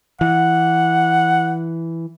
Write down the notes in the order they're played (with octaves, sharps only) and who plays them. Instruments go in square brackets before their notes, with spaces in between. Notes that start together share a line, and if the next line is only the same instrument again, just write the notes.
[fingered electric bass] E3 [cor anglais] F#5